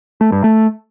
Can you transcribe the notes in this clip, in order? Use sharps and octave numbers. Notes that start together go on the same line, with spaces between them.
A3
G2
A3